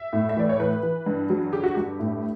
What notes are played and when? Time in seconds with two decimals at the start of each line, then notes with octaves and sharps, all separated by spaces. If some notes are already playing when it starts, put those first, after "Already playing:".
Already playing: E5
0.13 A2
0.29 E5
0.37 E3 D5
0.49 C#5
0.59 E3 B4
0.83 E3
1.06 G2
1.30 F#3
1.53 D3 G4
1.64 F#4
1.74 G2 G4
1.99 A2